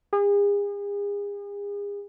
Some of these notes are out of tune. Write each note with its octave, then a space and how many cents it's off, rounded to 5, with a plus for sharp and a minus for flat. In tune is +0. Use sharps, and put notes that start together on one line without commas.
G#4 -40